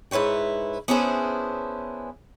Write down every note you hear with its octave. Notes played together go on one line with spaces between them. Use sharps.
G#2 E4 B4 C#5 G5
B3 C#4 D4 E4 G#4 C5